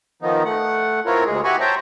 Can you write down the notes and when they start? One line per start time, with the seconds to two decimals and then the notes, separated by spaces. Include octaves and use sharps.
0.22 D#3 F3 B3 D#4
0.45 A3 F#5
1.06 B3 C4 E4 F4 A#4 C#5
1.26 D2 G#3 G#4
1.44 E4 F#4 G4 G#5 B5 C#6
1.60 C5 C#5 E5 G5 A5 A#5